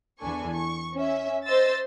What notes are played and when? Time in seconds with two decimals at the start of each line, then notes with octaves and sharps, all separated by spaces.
0.19 E2 E3 D4 A4 G#5 C#6
0.53 C#6
0.94 C#4 E5
1.47 C5 D#5 C6 E6 A6